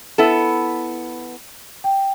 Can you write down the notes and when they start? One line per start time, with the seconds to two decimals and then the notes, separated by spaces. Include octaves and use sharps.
0.18 B3 E4 A4
1.84 G5